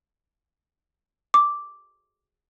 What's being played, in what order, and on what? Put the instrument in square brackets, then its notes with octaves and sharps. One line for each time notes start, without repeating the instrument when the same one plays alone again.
[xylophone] D6